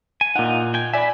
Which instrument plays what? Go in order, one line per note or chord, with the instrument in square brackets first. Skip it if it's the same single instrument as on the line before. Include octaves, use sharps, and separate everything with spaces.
[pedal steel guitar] G#5
[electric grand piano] A#2 F#5 [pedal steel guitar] D#4 F4
[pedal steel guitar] G5 G#5
[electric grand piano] D5 G#5 [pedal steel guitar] E5 B5